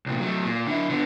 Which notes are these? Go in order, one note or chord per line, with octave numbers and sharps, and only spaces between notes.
C2 A#2
F#3 A3
A#2
D3 E4
D3 B3